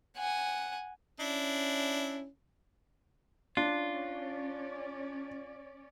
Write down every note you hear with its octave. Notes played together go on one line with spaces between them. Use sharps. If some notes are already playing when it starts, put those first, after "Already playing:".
F#5 G#5
C#4 D4 E4
C#4 D4 F4 D5